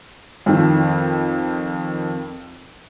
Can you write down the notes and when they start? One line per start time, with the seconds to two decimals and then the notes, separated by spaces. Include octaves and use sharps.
0.46 F2 D#3